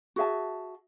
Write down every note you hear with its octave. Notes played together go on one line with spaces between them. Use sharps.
F#4 G#4 E5 A5